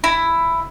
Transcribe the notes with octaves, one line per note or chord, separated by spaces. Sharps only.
E4